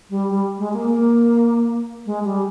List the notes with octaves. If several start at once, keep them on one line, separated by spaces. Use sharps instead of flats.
G3
G3
G#3
A#3
A#3
G#3
G3